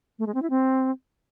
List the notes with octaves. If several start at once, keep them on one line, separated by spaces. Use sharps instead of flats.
A3
G#3
C4
E4
C4